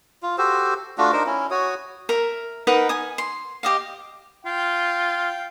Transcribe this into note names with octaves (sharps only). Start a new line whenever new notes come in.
F4
F#4 G4 A4 C5
A3 D4 F4 F#4
D4 D#4 A#4 C5
C#4 E4
F#4 C#5 D#6
A#4 E5
D#4 A#4 B4 F#5
G#5 D#6
C6
G4 D#5 F5
F4 F5 G5